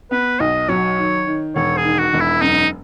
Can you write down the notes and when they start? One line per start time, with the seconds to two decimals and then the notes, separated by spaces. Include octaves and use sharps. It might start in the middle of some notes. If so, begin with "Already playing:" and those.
0.11 B3 B4
0.40 B1 D#5
0.69 F#3 C#5
0.98 D#3
1.27 D#3
1.56 E1 C#5
1.77 G#4
1.84 D#3
1.99 F#4
2.13 E1
2.20 E4
2.42 F#2 D#4